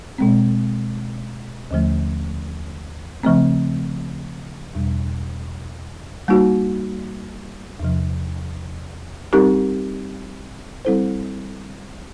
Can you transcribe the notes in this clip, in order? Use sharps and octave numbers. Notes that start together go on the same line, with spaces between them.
B2 G#3 C4
D#2 D3 F3 A3
C#3 F3 A3 C4
E2 B2 G3
G3 A#3 D#4 F#4
E2 C3 F3
G3 C4 D#4 G4 A#4
G3 C4 E4 A4 C5